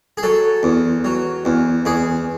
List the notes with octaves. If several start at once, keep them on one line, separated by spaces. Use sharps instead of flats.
G#4
F#3 A4
E2
F#3
E2
E2 G#4